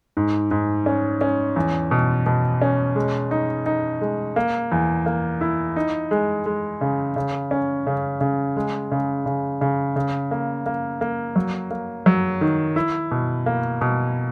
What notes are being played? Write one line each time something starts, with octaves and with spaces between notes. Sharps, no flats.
G#2
G#2
C#4
C#4
E2
B2
B2
C#4
G#3
D#4
D#4
G#3
A#3
E2
A#3
E4
D#4
G#3
G#3
C#3
C#3
C#4
C#3
C#3
G#3
C#3
C#3
C#3
C#3
A#3
A#3
A#3
F#3
A#3
F#3
D#3
E4
B2
A#3
B2